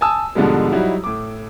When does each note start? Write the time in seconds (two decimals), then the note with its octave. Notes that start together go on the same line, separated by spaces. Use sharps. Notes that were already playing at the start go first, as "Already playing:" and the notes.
0.01 G#5 A5 D#6 E6
0.35 G#2 B2 D3 F3 G3 G#3
0.72 F#3 G3 D#4 E4 F#4
1.04 A2 D6